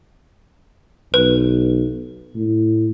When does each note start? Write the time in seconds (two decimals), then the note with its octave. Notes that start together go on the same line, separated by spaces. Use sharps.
1.14 B1 B4
2.35 A2